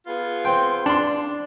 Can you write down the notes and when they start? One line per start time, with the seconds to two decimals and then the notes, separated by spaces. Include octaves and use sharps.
0.06 B3 F4 G#4
0.45 C4 G5 C6
0.86 D4 D5 C6